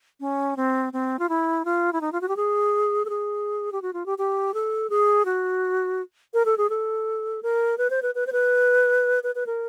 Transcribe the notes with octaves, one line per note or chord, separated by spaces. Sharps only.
C#4
C4
C4
F4
E4
F4
E4
D#4
F4
F#4
G4
G#4
A4
G#4
G4
F#4
F4
G4
G4
A4
G#4
F#4
A#4
A4
G#4
A4
A#4
B4
C5
B4
B4
C5
B4
B4
B4
A#4